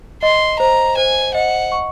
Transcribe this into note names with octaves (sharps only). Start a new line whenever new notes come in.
D#5 C6
C5 A#5
C5 G#5
D#5 F#5
C#6